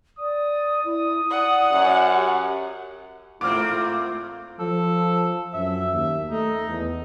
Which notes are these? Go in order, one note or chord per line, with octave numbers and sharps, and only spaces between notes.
D5 D#6
E4
D5 F#5
F#2
G4
G#2 A3 A#3 C4 F4 D6 F6
F3 A4
F#2 E5
D#2
A3 D#4
E2